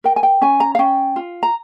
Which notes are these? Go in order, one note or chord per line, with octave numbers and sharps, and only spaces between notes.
A#4 G5
G#5
G5
C#4 G#5
A#5
F5
C#4 G5
F4
A#5